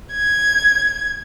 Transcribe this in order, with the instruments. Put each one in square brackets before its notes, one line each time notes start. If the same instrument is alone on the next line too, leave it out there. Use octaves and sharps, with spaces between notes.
[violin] G#6